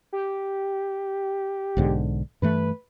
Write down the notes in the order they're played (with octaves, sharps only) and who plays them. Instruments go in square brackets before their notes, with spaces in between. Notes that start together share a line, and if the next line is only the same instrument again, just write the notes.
[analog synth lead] G4
[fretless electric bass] B1 G#2 D3
[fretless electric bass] G2 E3 A3 [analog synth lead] B4